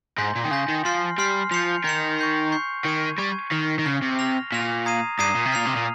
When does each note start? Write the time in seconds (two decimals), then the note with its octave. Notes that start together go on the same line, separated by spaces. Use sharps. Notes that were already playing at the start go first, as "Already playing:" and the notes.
0.18 G#2 G#5 C6 G6 A#6
0.36 A#2
0.44 D#3
0.51 C#3 G#5 C6 G6 A#6
0.69 D#3
0.85 F3 C6 F6 C7
1.18 G3 C6 F6 C7
1.51 F3 G6 C#7 F7
1.85 D#3 G6 C#7 F7
2.19 C#6 G6 C7
2.52 C#6 G6 C7
2.85 D#3 C#6 G#6 D#7
3.18 G3 C#6 G#6 D#7
3.51 D#3 F6 C7 G7
3.79 D#3
3.86 C#3 F6 C7 G7
4.02 C3
4.19 F6 A#6 F7
4.52 A#2 F6 A#6 F7
4.86 A#5 D#6 G#6 C7 D#7
5.19 G2 A#5 D#6 G#6 C7 D#7
5.35 A#2
5.45 C3
5.52 A#2 F6 C7 F7
5.65 C3
5.75 A#2